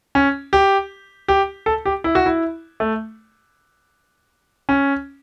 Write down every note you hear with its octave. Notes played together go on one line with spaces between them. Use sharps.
C#4
G4
G4
A4
G4
E4
F#4
E4
A3
C#4